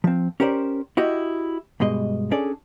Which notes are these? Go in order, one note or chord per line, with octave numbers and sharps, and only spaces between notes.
F3 C4
C#4 G4 A#4 C5 D5
E4 F#4 G4 D#5
G2 B2 G#3 D#5
C#4 D4 G#4 A4 D5